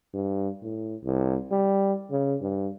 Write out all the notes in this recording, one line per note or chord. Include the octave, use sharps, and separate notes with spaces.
G2
A2
C2
G3
C#3
G2